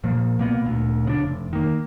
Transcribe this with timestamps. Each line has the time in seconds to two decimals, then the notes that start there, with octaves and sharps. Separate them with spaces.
0.04 A#2 F3 A#3
0.39 B2 A#3 B3
0.65 D2 A#2
1.05 C#3 B3 D4
1.23 F1
1.53 D#3 A#3